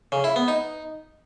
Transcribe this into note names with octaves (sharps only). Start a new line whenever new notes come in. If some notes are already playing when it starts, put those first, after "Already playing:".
C#3
E4
B3
D#4